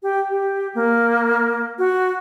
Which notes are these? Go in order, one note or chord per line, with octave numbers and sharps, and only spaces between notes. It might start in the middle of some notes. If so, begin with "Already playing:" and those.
G4
G4
A#3
F#4